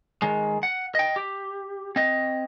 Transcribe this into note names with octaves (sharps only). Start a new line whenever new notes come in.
D#3 G#3
F#5
D#5 G5
G4
C4 D#5